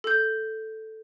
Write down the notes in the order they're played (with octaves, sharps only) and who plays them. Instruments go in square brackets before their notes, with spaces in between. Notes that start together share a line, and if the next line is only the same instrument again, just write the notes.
[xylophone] A4 G6